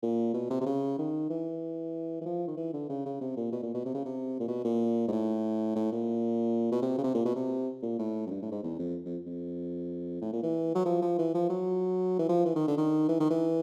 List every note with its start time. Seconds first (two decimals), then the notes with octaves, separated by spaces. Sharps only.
0.03 A#2
0.34 B2
0.50 C3
0.61 C3
0.66 C#3
0.99 D#3
1.30 E3
2.21 E3
2.26 F3
2.48 D#3
2.57 E3
2.74 D3
2.89 C#3
3.06 C#3
3.21 C3
3.37 A#2
3.53 B2
3.63 A#2
3.74 B2
3.86 C3
3.95 C#3
4.06 C3
4.40 A#2
4.48 B2
4.64 A#2
5.08 G#2
5.12 A2
5.76 A2
5.92 A#2
6.72 B2
6.82 C3
6.98 C#3
7.04 C3
7.15 A#2
7.25 B2
7.36 C3
7.83 A#2
7.99 A2
8.27 F#2
8.31 G2
8.42 A2
8.52 G#2
8.63 E2
8.79 F2
9.06 F2
9.26 F2
10.22 A2
10.33 A#2
10.43 E3
10.75 F#3
10.85 F3
11.02 F3
11.18 E3
11.34 F3
11.50 F#3
12.19 E3
12.29 F3
12.46 E3
12.56 D#3
12.68 D3
12.77 D#3
13.09 E3
13.20 D#3
13.31 E3